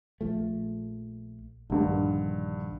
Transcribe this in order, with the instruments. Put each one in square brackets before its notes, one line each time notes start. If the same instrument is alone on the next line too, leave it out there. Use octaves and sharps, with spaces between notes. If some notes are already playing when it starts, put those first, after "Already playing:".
[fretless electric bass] A#1 F3 A3
[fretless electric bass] A#1 D#3 [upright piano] G2 D3